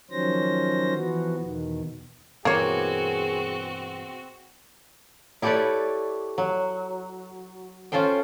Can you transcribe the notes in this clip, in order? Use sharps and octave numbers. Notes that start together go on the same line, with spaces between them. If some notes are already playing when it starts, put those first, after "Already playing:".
D#3 F3 F#3 C#4 C5 A#6
E3 F3 B3 F#4
E2 B2 D#3
G2 B2 E3 A#3 C4 F#4 G#4 C#5
E4 G4 A4 B4 C#5 D5
F#3
C#4 F4 A4 C5 G5